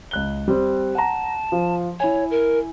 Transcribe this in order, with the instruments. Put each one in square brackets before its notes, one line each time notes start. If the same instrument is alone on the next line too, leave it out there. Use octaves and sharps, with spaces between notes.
[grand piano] C#2 F#6 G7
G3 C4
[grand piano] F#5 A#5 [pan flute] A5
[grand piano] F3
[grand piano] E4 G#5 [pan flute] C#5
[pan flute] A#4